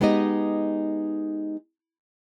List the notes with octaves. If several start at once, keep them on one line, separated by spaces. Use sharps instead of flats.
G#3 B3 D#4 G4 D#5